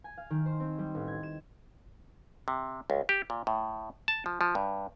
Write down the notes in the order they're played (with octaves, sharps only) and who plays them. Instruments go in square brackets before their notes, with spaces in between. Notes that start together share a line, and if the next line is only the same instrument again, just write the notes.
[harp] G#5
F5
D#3
C5
C4
G3
A1
G#6
E7
[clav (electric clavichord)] C3
C#2
G4
A#2
A2
A5
F3
F3
G2